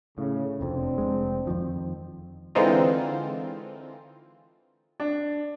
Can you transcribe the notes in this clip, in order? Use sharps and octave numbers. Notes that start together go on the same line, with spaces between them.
A2 C#3
F1 F2 C4 D4
F1 G#3
F2 D#3 F3
D3 E3 G#3 C4 D#4 F4
D4